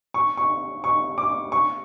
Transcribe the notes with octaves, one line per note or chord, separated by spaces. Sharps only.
C#6
C#6
C#6
D6
C#6